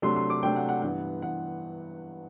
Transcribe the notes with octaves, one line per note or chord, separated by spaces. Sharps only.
C3 F#3 A3 D4 C6
C6
D6
C3 F#3 A3 D4 G5
F#5
F#5
G2 E3 B3 F#5
G2 E3 B3 F#5